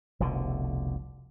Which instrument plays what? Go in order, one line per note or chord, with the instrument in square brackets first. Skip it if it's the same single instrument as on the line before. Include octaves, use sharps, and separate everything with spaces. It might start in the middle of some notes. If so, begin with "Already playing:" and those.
[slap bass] F1 C2 B2 D3